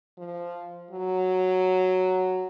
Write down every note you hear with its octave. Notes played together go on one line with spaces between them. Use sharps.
F3
F#3